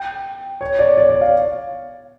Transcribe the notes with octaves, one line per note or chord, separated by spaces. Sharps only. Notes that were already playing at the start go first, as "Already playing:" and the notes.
Already playing: G5
C#5
D5
D5
D5
F5